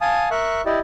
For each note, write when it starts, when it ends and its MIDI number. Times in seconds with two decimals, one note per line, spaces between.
0.01 0.29 77
0.01 0.29 80
0.01 0.29 81
0.01 0.29 87
0.31 0.61 70
0.31 0.61 76
0.31 0.61 85
0.31 0.61 90
0.66 0.79 64
0.66 0.79 67
0.66 0.79 74
0.66 0.79 75